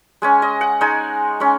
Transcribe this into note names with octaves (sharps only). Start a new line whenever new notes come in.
G#3 C#4 G#5
D#5
F#5
G#3 D#4 G#5
G#3 C#4